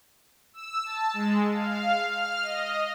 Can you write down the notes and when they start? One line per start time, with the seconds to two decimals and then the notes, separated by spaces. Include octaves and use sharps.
0.53 E6
0.84 A5
1.14 G#3
1.53 F5
2.06 F6
2.42 D#5